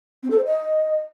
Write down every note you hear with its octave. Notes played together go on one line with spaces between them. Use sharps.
C4
A4
C5
D#5